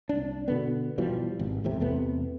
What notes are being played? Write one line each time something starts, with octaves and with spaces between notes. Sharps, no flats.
C2 D4
B2 D3 B3
B2 E3 F3 G3
G#1
A1 E2 A2 C3
E2 C3 A3 B3